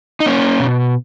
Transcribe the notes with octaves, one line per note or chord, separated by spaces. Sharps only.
D#4
A#3 C#4
B2